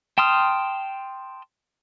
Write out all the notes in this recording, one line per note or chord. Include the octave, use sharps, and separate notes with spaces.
G5 A5 C6 D#6 F6